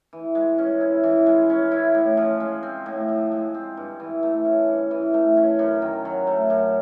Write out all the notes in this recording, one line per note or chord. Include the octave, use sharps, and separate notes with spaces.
E3
G#3
C#4
E4
E3
G#3
C#4
E4
A2
F3
G#3
C4
A2
F3
G#3
C4
G2
E3
A3
C#4
G2
E3
A3
C#4
F#2
D#3
F#3
A3
F#2